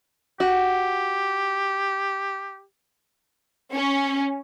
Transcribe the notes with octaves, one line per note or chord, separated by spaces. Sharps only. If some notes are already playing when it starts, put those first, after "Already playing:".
F#4 G4
C#4